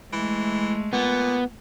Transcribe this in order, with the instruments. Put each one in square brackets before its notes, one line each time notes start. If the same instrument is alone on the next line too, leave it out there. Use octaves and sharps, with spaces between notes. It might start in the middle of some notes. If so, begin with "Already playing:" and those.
[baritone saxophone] E3 [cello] G#3 A3
[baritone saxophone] A#2 [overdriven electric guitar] B3